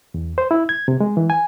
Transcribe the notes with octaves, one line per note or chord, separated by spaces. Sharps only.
E2
C5
E4
G#6
C3
G#3
E3
G#5